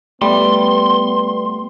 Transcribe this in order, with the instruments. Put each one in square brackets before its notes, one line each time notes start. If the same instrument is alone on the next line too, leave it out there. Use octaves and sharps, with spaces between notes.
[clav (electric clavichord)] G3 [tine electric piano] A3 [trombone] B3 [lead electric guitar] C6